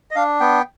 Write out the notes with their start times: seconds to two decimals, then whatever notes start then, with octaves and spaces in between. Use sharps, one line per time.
0.11 D#5
0.16 D4 F5
0.40 B3 G5